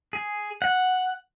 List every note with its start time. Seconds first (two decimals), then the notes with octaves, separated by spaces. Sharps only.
0.13 G#4
0.62 F#5